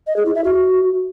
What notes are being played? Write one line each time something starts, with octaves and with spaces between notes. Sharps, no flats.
D#5
G#4
E4
E5
F#4